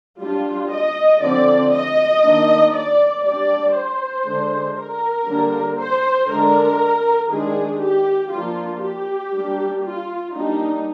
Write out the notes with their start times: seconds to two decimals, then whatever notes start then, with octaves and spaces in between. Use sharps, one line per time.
0.20 G3 D4 F4
0.70 D#5
1.22 D3 F3 C4 D5
1.72 D#5
2.24 D#3 A#3 D4
2.74 D5
3.24 G3 D4 D5
3.75 C5
4.25 D3 G#3 D4
4.76 A#4
5.28 D3 G3 A#3 D4
5.78 C5
6.28 D3 G#3 D4 A#4
7.31 D#3 G#3 D4 G#4
7.81 G4
8.31 F3 A#3 D4 F4
8.82 G4
9.34 G3 A#3 D4
9.84 F4
10.35 G3 A#3 D4 D#4